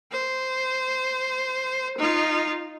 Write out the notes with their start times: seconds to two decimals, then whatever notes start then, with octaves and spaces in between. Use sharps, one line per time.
0.12 C5
1.98 D#4 F4